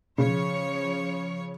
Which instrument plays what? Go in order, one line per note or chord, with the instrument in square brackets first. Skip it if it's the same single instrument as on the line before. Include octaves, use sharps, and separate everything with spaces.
[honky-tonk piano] C#3 [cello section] F3 C#5